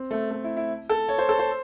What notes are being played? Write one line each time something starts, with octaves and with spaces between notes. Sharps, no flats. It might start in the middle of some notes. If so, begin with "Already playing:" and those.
Already playing: C4
A3
A3
E4
E4
A4
C#5
C5
A4
C5